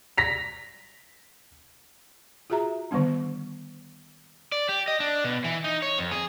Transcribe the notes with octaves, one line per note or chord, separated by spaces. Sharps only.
A#6 B6 F7
F4 F#4 G#4 E5 A#5
D3 D#3 G3 B3 D4
D5
G4
D#5
D4
B2
E3
D#4
C#5
F2
G#4